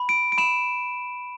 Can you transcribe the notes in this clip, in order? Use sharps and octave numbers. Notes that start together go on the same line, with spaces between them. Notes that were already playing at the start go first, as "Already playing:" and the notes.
Already playing: B5
D7
D7
B5 E7